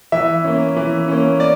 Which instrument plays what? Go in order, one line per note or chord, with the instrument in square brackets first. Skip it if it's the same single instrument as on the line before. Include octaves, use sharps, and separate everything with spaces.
[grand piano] E3 E5
A#3 C#4
E3
A#3 C#4
D5